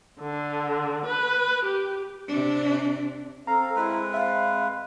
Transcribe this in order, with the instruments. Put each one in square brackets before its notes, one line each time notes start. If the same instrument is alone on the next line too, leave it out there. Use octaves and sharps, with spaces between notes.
[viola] D3
B4
G4
[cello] C3 D4
[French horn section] C4 [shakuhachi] A4 [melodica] F5 [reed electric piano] A#5
[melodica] G#3 B4 [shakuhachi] E4
[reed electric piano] E5 [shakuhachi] F5